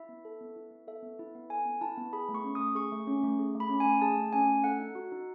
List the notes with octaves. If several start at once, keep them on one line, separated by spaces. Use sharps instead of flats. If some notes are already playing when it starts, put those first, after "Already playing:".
Already playing: E4 E5
B3
A4
B3
E4
B3
A4 E5
B3
E4
B3
A4 G#5
B3
E4 A5
B3
G#4 B5
A3
C#6
C#4
A3 D#6
G#4 C#6
A3
C#4
A3
G#4
A3
B5
C#4
A3 G#5
G#4 A5
A3
C#4 G#5
A3
A4 F#5
D#4
F#4
D#4